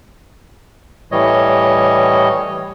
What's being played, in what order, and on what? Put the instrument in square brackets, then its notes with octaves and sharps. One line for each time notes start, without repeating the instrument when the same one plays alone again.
[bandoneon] A2 E3 G3 C#5 D#5